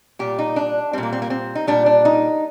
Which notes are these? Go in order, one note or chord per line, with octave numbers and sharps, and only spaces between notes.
A#2 G3 G4
D#4
D4
A#2 G3 C4
A#3
C4
A#3
C4
D#4
A#2 G3 D4
D4
D#4